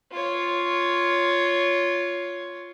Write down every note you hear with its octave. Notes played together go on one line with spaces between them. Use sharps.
F4 C#5